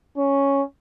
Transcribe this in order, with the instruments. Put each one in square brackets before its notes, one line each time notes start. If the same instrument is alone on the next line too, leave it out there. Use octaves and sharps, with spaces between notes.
[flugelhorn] C#4